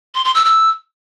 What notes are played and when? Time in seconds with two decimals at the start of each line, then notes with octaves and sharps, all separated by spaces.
0.15 C6
0.25 C6
0.35 E6
0.45 E6